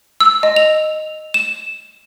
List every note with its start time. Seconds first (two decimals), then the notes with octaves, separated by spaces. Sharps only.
0.20 E6
0.43 D#5
0.56 F7
1.34 E7